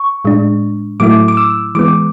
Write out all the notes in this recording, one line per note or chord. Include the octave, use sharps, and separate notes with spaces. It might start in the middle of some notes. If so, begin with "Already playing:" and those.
Already playing: C#6
A2 G#3 D4
A2 F#3 A3 E4 D6
D6
E6
E3 G#3 B3 D6